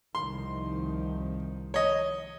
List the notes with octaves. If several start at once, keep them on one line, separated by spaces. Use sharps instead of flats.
C2 D#3 F3 C6
C#5 D#5